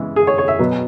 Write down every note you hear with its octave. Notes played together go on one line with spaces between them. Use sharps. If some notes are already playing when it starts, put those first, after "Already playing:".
Already playing: C#3 E3 G#3 B3
G#4
C#5
C#5
E5
B2 F#3 B3